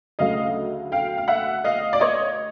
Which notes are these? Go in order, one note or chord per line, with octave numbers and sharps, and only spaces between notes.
D2 C#3 F#3 A3 D#5 F5
F5 G5
F5
E5 F#5
D#5 F5
D5
C#5 D#5